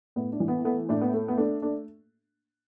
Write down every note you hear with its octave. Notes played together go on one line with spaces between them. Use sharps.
A2 B3
D4
E3
B3
A3 B3
A2 D4
B3
A3
B3
A3 D4
A3 D4